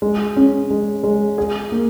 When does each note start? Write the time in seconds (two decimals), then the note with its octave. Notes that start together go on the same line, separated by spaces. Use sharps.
0.02 G#3
0.36 C#4
0.70 G#3
1.04 G#3
1.38 G#4
1.72 A#3